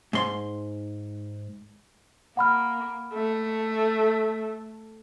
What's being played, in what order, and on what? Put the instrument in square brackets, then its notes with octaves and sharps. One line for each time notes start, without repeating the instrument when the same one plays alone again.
[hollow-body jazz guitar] G#2 C6
[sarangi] A#3 [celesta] F#5 B5 F6
[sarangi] A3